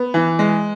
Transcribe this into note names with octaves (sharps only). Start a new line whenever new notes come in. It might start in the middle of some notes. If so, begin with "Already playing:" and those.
Already playing: B3
E3
G#3